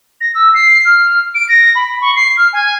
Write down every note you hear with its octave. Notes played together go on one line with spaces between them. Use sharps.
A#6
E6
C7
F6
D7
A#6
B5
C#6
C7
F6
G#5